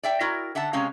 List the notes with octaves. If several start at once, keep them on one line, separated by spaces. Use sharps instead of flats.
D5 E5 G5
E4 F#4 A#4 D5
D3 E5 F#5 A5
C3 G#3 C#4 C#5 F5